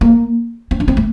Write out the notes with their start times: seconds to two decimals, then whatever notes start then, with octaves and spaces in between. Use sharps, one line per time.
0.01 A#3
0.71 C4
0.80 D4
0.88 C4
0.97 A3